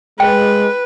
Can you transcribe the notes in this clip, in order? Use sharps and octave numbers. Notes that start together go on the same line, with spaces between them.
G#3 B4 G5